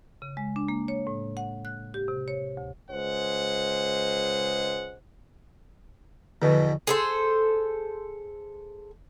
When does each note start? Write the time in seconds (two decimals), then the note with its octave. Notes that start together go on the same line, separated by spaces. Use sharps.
0.22 C#3
0.37 G#3
0.56 D4
0.68 A#3
0.88 C#5
1.07 A2
1.37 F#5
1.65 F#6
1.94 G4
2.08 C3
2.28 C#5
2.57 D2
2.91 C#2 G#3 C5 F#5
6.42 E2 B2 D3 F3
6.87 G#4 A4 C5